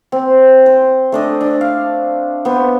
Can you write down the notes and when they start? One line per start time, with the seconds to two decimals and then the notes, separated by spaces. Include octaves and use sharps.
0.12 C4
0.66 C5
1.12 A3 D4 D#5
1.41 D4
1.61 F5
2.45 B3 C5